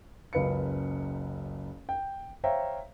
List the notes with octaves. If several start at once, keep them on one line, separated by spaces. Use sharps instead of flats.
F#1 C#2 B4 F5 C#7
G5
C5 C#5 E5 F5 G5 A#5